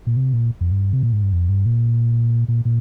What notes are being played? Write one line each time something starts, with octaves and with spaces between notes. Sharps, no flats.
A#2
C3
A#2
F2
G2
C3
A#2
G#2
G2
F2
G2
A#2
A#2
A#2